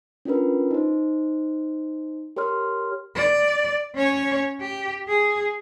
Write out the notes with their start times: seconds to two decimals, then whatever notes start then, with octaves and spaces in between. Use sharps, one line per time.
0.25 C#4 D4 F4 A#4 B4
0.71 D#4 C5
2.36 G4 A#4 C#5 C6 F6
3.15 D5
3.95 C#4 C#5
4.61 G4
5.08 G#4